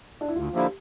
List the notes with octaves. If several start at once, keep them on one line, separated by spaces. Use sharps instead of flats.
D4
E4
D2 F4
D3 F3 A#3 E4 G4